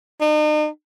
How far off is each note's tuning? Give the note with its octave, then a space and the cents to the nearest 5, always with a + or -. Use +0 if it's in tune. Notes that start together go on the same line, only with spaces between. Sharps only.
D#4 -40